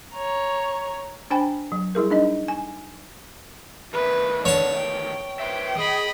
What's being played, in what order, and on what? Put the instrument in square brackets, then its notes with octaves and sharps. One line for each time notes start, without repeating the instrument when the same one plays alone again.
[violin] C#5 A#5
[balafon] D4 C5 G5 G#5 B5
F#3
G3 E4 G#4 A#4
D4 D#4 D#5
G#5
[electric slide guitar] E2 D#3 A3 [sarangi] B4
[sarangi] D3 [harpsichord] C#5 A5
[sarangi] G5
[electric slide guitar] B4 C5 E5 [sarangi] G5
[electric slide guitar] G#4 [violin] D#5 B5